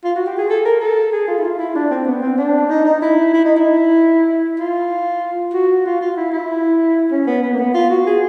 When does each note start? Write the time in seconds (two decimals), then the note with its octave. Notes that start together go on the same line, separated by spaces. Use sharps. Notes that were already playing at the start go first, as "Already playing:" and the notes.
0.04 F4
0.16 F#4
0.26 G4
0.38 G#4
0.50 A4
0.65 A#4
0.81 A4
1.12 G#4
1.28 F4
1.38 E4
1.44 F4
1.59 E4
1.75 D4
1.91 C4
2.07 B3
2.22 C4
2.38 D4
2.69 D#4
2.85 D#4
3.02 E4
3.34 E4
3.45 D#4
3.56 E4
4.59 F4
5.54 F#4
5.86 F4
6.01 F4
6.17 E4
6.32 E4
7.11 C#4
7.27 B3
7.43 B3
7.53 A#3
7.59 B3
7.74 F4
7.90 F#4
8.07 G#4